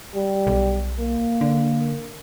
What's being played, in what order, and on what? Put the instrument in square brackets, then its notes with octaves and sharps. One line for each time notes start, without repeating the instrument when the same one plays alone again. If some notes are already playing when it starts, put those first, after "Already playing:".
[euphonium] G3
[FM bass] B1
[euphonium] A#3
[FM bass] D3